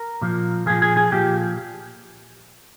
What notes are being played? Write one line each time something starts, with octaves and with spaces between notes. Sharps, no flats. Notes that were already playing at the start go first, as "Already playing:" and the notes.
Already playing: A#4
A#2 F3
A#2 F3 G#4
G#4
G#4
A#2 F3 G4